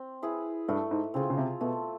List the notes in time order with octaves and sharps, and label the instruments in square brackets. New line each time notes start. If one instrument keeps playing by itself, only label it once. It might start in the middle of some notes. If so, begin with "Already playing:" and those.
Already playing: [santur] C4
E4 G#4 B4
[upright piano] G2 [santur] A3
[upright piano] G#2
[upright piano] C#3 [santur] C4 F4 G#4
[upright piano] C#3
C3
[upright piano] B2 [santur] A3